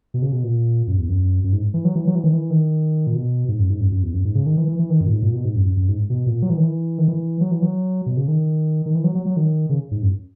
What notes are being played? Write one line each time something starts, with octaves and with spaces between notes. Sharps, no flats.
B2
C#3
B2
A#2
F#2
E2
F#2
F#2
G#2
E3
F#3
E3
F#3
E3
D#3
E3
D#3
A#2
B2
G#2
F#2
G#2
F#2
F#2
E2
F#2
G#2
C#3
D#3
E3
E3
E3
D#3
F#2
A#2
G#2
A#2
B2
G#2
F#2
F#2
F#2
G#2
B2
A#2
F#3
E3
D#3
E3
D#3
E3
F#3
E3
F#3
B2
C#3
D#3
D#3
E3
F#3
F#3
F#3
D#3
C#3
G#2
F#2